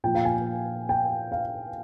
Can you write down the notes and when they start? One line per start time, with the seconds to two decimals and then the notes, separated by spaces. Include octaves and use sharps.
0.04 A#2 F3 G5
0.15 F5
0.25 G#5
0.89 G5
1.32 F5